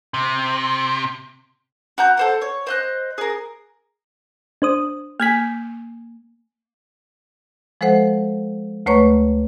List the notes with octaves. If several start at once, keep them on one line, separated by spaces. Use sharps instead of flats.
C3
F#4 A#5 G6
A4 C5 F#5
C#5
C5 D#5 F#6
G#4 A#4
D4 C5 D#6
A#3 G#5 F6 G#6 B6
F3 G#3 A4 C5 F#5
D2 A3 B4 C#5 A#5 C#6